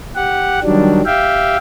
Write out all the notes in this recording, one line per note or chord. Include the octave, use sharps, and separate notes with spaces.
G4 F#5
D#3 F#3 G3 D4
G4 E5 F5 G5